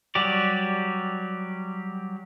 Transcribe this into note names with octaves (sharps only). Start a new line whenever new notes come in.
F#3 G3 G4 D5